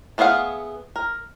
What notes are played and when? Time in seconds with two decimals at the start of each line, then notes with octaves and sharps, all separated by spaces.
0.18 A3 B3 G#4 F5 F#5
0.96 A#4